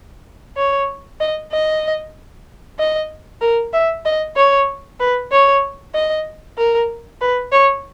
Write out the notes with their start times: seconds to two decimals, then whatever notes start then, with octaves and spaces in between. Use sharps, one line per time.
0.57 C#5
1.21 D#5
1.52 D#5
2.79 D#5
3.41 A#4
3.73 E5
4.06 D#5
4.36 C#5
5.00 B4
5.32 C#5
5.94 D#5
6.58 A#4
7.21 B4
7.52 C#5